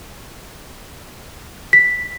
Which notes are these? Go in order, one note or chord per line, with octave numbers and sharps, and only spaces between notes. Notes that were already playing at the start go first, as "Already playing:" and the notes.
B6